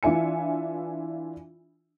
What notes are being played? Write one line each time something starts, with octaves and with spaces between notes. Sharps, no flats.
E3 D4 F4 E5 G#5 C#7